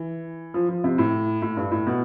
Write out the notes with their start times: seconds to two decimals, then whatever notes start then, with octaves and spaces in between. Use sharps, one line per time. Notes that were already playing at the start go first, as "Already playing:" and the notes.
Already playing: E3
0.54 F3
0.69 F3
0.84 C3
0.98 A2
1.42 A2
1.57 G2
1.71 A2
1.87 B2